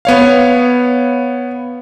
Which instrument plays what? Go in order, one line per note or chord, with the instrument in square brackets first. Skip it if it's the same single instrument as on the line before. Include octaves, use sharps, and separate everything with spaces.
[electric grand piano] B3 C#5 F5